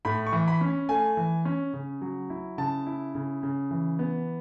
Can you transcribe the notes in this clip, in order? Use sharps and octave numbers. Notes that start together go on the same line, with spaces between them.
A2 B5
C#6
E3
B5
C#4
A3 G#5
E3
C#4
C#3
F#3
E4
C#3 A5
E4
C#3
C#3
E3
B3